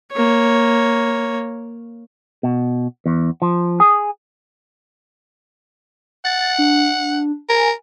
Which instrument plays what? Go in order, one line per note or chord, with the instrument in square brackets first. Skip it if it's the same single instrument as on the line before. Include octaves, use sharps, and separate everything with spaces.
[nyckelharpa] A#3 C#5
[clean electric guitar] B2
E2
F3
G#4
[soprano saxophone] F#5 [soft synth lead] A6
[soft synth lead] D4
[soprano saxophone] A#4 [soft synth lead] G#5